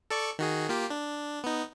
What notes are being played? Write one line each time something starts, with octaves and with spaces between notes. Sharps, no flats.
A4 D5 C#6
D#3 F#4 G#4
A#3 F4 G4
D4
B3 D#4